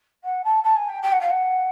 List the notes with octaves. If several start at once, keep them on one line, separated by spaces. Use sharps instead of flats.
F#5
A5
A5
G#5
G5
G5
F#5
F5
F#5